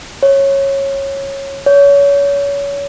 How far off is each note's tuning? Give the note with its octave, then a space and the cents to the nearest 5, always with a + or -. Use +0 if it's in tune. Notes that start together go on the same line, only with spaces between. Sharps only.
C#5 -15
C#5 +30